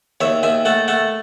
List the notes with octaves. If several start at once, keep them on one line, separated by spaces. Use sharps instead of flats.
D#2 C#5 E5
D#2 E5 G#5
A3 F#5 A5
A3 F#5 A5